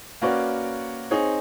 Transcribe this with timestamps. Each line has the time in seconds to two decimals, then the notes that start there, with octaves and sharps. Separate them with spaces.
0.22 A#3 C#4 F#4 B4 D5
1.11 C4 D#4 G#4 C#5